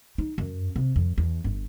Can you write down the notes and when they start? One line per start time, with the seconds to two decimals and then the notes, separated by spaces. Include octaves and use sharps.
0.18 D#4
0.38 F#2
0.76 C3
0.96 F2
1.18 E2
1.44 G1